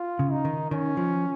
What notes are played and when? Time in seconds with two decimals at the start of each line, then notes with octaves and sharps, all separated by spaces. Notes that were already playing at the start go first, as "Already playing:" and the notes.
Already playing: F4
0.19 C#3
0.32 D#4
0.45 D#3
0.71 D#3 C#4
0.97 F3